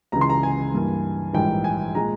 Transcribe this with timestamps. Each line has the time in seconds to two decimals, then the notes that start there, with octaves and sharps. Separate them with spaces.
0.12 C#2 C#3 E3 A#5
0.21 C6
0.30 A#5
0.43 G#5
0.74 G2 E3 A#3
1.34 A#1 G#2 E3 G3 A#3 G5
1.64 G#5
1.95 A#2 G#3 A#5